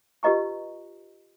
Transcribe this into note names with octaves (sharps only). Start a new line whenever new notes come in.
F4 G4 B4 D#5 A#5 C#6